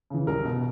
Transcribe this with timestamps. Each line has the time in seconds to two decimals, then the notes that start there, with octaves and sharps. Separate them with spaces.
0.10 C#3 E3
0.27 C2 A#4
0.45 B2